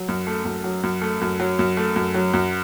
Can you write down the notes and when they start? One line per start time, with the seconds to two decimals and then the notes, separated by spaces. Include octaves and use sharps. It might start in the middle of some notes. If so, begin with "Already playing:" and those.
Already playing: F#3
0.08 F#2
0.27 A3
0.45 F#2
0.64 F#3
0.83 F#2
1.02 A3
1.21 F#2
1.40 F#3
1.59 F#2
1.77 A3
1.96 F#2
2.14 F#3
2.33 F#2